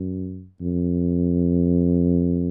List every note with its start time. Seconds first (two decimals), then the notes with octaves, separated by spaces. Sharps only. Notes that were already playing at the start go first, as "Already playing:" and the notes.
Already playing: F#2
0.60 F2